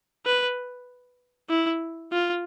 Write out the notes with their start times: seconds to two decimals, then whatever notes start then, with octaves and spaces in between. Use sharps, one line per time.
0.26 B4
1.49 E4
2.12 F4